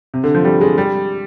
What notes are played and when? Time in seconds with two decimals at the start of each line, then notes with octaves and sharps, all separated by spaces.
0.14 C3
0.24 D3
0.35 F3
0.45 G3
0.61 G#3
0.78 G3